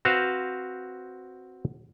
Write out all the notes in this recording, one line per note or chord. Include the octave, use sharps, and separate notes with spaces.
C4 F#4 B4 C5 F5